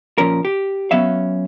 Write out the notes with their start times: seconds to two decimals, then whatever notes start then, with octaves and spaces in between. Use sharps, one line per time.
0.18 A#2 F3 C#4 A#4
0.45 G4
0.91 F#3 B3 C#4 E5 F5